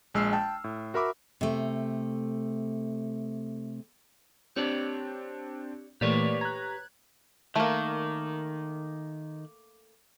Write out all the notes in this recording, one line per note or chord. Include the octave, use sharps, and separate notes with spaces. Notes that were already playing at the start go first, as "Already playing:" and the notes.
A#1 G#3 E6 F6 C7
G5 A5
A2
F#4 A#4 E5 B5 D6 E6
C3 A3
C4 D4 G4 C#5 D5
A#2 E3 A3 A#3 G4 B4 C#5 D5
A#5 F#6 G#6
D#3 A3 A#3